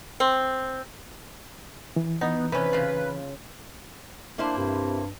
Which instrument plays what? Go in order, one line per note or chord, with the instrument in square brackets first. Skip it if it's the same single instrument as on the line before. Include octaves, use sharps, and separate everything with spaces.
[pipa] C4
[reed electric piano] E3
[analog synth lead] B3 [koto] D#4
[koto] C3 C#4 [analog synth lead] B4
[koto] C#3 F4
[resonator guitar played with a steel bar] A#3 E4 C5 [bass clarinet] D4
[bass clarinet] G2 [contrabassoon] C3